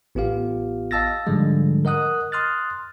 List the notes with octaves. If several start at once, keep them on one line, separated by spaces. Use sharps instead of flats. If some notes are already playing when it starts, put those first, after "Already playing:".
A1 B3 F4 G4 F5
D#5 F5 A5 E6 A6 A#6
G#2 D3 F3 G3 G#3
A#4 D#5 F#5 D#6 F#6
C6 D#6 F6 F#6 A6